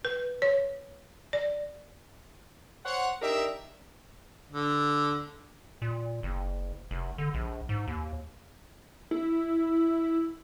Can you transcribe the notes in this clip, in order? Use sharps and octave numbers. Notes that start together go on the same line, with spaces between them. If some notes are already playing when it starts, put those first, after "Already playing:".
B4
C#5
D5
C5 C#5 F#5
D4 D#4 G4 A#4 E5
D3
A#2
F#1
F1
D3
A#1
G#2
D#2
E4